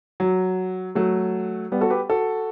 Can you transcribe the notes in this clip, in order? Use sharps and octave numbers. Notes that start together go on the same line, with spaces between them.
F#3
F#3 A3
G3 B3
F#4 A4
G4 B4
F#4 A4